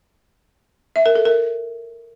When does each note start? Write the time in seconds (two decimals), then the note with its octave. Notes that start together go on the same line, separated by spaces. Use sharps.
0.96 E5
1.06 A#4
1.16 A4
1.25 A#4